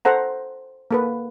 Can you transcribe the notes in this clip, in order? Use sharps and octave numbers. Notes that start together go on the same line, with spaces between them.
A4 C5 F#5 A#5
A#3 A4 B4